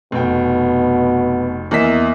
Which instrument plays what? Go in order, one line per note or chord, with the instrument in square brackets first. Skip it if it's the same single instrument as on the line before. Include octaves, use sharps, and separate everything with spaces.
[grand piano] F1 G5 [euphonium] B2
[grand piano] E2 D#5 B6 [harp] A#3 A#4 E5